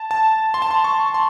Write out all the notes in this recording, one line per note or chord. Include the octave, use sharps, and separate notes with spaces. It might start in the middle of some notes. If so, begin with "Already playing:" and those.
Already playing: A5
A5
C6
A5
C6
C#6
C6